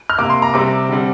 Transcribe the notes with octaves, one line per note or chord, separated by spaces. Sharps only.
F6
C3 A#3 D6
C6
A#5
C3 G3 C4 D6
D3 G3 C4